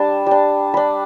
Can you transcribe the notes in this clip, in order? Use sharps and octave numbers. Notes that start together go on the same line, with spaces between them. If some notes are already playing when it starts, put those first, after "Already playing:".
Already playing: G3 D4 A5
G3 D4
G3 D4 B5